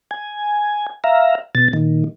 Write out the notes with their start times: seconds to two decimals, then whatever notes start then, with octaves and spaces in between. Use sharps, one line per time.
0.11 G#5
1.04 E5 F5 A#5
1.55 B2 A6
1.73 A#2 D#3